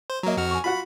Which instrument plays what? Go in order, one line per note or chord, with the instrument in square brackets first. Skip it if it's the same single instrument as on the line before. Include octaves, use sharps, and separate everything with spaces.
[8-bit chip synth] C5
[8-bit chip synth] F#3 A#3 [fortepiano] D#5 A#5
[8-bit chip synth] F2 F#4 F6
[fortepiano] G#5 C#6
[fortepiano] F4 F#4 F#5 [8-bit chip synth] B5